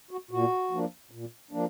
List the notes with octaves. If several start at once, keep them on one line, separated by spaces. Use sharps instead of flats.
F#4
A#2 F#4
F3 A#3 D4
A#2
F3 A#3 D4